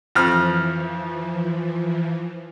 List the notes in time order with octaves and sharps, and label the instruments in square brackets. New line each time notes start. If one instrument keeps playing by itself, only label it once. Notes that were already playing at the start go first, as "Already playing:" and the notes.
[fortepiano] F2 F6 [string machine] E3 F3